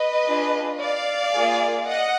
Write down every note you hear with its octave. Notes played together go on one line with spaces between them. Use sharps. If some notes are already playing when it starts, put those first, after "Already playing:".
Already playing: B4 D#5
D4 F4 G#4
D5 F5
A#3 F4 G#4
D#5 F#5